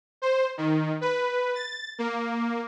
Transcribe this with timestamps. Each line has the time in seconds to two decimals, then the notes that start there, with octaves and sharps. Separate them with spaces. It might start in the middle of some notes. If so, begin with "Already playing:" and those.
0.22 C5
0.58 D#3
1.01 B4
1.55 A6
1.98 A#3